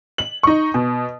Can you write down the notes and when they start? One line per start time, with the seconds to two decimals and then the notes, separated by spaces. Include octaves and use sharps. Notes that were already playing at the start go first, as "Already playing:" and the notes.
0.18 F#7
0.43 D#4 C#6
0.74 B2